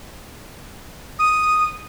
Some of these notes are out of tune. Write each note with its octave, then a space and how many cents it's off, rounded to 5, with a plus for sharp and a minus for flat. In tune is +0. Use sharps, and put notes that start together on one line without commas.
D#6 +0